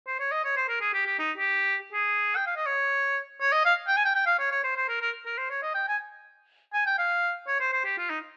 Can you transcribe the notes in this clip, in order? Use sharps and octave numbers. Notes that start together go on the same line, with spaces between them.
C5
C#5
D#5
C#5
C5
A#4
G#4
G4
G4
D#4
G4
G#4
G5
F5
D#5
C#5
C#5
D#5
F5
G5
G#5
G5
G5
F5
C#5
C#5
C5
C5
A#4
A#4
A#4
C5
C#5
D#5
G5
G#5
G#5
G5
F5
C#5
C5
C5
G4
F4
D#4